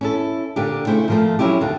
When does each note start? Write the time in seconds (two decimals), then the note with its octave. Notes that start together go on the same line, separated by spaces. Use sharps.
0.01 C#4 E4 A4
0.56 A#2 D3 D4 G4
0.87 C#3 A3 E4 C5
1.08 A#2 F3 A3
1.39 F#3 C#4 E4 F4 G4
1.61 D#2 D3 F4